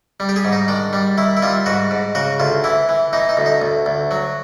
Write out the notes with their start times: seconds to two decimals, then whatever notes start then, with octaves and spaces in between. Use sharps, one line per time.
0.20 G3
0.29 G4
0.36 G#4
0.45 G#2
0.52 D#4
0.68 D#3 D4
0.93 G3
1.18 D#3 E4
1.37 E4
1.42 G3 F4
1.66 G#2 F#4
1.91 G#2
2.15 C#3 F#4
2.40 D2 F4
2.64 E3 E4
2.89 E3
3.13 E3 D#4
3.29 D#4
3.37 D2
3.46 D#4
3.62 D2
3.86 D2
4.11 F#3